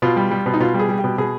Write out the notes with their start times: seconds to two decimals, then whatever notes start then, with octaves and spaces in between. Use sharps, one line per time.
0.02 B2 F4
0.16 G3
0.31 G3
0.46 B2
0.54 D#4
0.60 B2 F4
0.74 G3
0.79 G#4
0.89 G3
0.99 B2 G4
1.18 B2 G#4